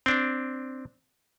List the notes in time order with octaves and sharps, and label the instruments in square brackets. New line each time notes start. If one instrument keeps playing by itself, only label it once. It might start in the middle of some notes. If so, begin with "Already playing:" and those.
[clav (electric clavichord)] C4 D4